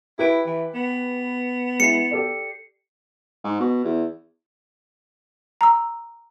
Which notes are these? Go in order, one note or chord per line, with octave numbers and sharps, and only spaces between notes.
E4 G4 B4 D7
E3
B3
G#3 E4 C7 C#7
G4 A4 D5
G#2
B2
E2
A#5 E6